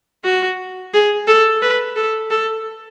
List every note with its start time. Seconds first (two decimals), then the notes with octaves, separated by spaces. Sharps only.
0.24 F#4
0.94 G#4
1.27 A4
1.62 B4
1.96 A4
2.30 A4